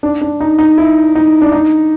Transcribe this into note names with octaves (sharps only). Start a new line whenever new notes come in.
D4
D4
D#4
D#4
E4
D#4
D4
D#4